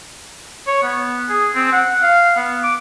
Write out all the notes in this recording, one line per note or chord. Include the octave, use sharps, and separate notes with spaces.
C#5
B3
G#4
C4
F#5
F5
B3
D6